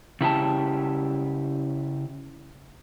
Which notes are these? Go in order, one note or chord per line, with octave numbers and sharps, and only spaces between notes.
C#3 E4 G4 A5